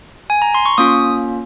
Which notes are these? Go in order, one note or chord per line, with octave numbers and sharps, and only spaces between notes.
G#5
A#5
C6
C#6
A#3 C#4 F4 D#6